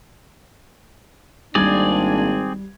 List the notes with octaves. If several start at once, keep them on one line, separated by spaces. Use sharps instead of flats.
G#1 G3 A#3 C4 D4 G#4 D5 G#6